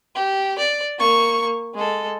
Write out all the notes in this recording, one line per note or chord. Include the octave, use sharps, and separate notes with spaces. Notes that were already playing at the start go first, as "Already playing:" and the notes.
G4
D5
A#3 C#6
G#3 A4